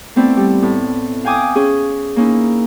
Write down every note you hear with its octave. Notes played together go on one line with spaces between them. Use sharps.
A3 B3 C4 E4 D5
G3
A2
F5 G5 G#5 D6 D#6
C#4 G#4
A#3 C#4 D#4 E4